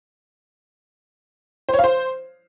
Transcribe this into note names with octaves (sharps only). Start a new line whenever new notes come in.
C5
C#5
F5
C5